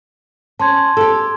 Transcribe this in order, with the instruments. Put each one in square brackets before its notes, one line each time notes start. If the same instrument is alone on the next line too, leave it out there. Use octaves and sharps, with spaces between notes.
[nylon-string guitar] C#4 [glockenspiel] A5 C6 G#6
[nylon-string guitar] G4 A4